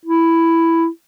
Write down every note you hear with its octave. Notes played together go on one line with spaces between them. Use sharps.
E4